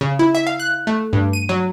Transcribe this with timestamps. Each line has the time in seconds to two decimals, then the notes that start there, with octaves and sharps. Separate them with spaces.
0.01 C#3
0.19 E4
0.35 E5
0.47 F5
0.60 F#6
0.87 A3
1.13 G2
1.33 D#7
1.49 F#3